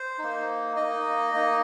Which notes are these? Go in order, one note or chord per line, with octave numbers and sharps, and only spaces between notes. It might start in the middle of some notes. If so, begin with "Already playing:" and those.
Already playing: C5
A#3 D#4
A#3 D#4 D#5
A#3 D#4